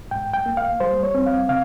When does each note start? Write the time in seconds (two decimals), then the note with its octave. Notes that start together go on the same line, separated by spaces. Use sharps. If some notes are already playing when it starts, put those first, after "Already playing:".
0.11 G#2 G5
0.34 G5
0.46 A#3
0.57 F5
0.80 G3 C5
1.03 C#5
1.15 C4
1.26 F5
1.49 C#3 F5